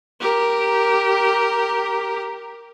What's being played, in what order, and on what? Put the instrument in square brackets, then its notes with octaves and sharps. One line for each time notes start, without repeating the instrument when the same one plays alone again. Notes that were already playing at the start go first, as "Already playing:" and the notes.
[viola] G4 A#4